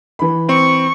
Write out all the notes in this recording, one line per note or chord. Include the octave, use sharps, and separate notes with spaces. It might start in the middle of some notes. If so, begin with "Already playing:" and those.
E3 B5
C4 C#6